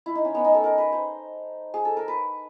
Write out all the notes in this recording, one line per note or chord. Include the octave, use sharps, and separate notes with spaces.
E4
D#4
C#4
B3
D#4
A4
A#4
B4
C5
G#4
A4
A#4
B4